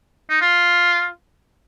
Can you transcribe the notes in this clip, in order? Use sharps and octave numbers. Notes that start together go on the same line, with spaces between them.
D#4
F4